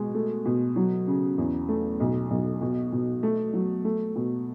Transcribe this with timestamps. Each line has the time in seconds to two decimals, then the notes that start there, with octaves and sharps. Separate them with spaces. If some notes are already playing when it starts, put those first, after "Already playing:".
Already playing: B2 G#3
0.15 A3
0.46 B2
0.76 F#3
1.07 C#3
1.38 E2
1.69 A3
2.00 B1
2.30 B1
2.61 B2
2.92 B2
3.23 A3
3.53 F#3
3.85 A3
4.16 B2